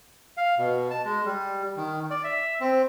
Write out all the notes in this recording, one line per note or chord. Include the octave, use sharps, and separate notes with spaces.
F5
B2
A5
G#3
G3
D#3
D5
E5
C4